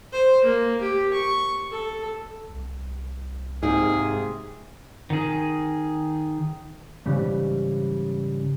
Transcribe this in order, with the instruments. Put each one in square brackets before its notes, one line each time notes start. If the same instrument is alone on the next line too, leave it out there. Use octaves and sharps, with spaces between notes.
[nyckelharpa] C5
A#3
G4
C#6
A4
[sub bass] C2
[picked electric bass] G#2 [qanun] C3 A#3 C4 [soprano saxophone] G#4
[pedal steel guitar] D#3 G#4
[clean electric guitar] G#2 C#3 E3 G3